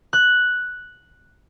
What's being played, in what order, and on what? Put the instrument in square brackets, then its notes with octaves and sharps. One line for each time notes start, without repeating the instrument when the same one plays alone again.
[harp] F#6